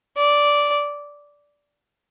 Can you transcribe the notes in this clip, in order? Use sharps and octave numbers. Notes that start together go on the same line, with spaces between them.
D5